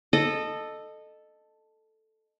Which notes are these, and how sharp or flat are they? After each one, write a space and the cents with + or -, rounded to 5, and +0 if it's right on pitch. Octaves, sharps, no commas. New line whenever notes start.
A4 +0 D#5 -20